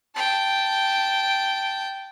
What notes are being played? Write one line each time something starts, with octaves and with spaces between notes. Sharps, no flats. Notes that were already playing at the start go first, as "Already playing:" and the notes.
G5 A5